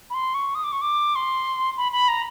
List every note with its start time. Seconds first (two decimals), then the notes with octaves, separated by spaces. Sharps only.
0.10 B5
0.14 C6
0.34 C#6
0.55 D#6
0.64 D6
0.72 C#6
0.82 D6
1.16 C6
1.77 B5
1.92 B5
2.08 A#5